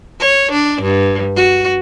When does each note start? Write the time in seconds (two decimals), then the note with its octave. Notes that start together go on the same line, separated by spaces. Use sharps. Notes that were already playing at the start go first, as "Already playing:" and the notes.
0.20 C#5
0.52 D4
0.82 G2
1.36 F#4